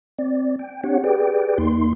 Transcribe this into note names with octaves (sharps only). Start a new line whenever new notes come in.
C4 D5
G5
C4 D4 G4 C#5 F#5
G4 G#4 B4 D5 G5
E2 A#3 D#4 C6